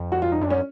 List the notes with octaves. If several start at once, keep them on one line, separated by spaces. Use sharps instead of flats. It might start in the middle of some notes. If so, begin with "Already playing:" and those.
Already playing: F2
F#4
F4
D#4
F#2 D4
C#4